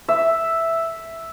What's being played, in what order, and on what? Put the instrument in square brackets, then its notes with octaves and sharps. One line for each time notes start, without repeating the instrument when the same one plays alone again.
[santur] E5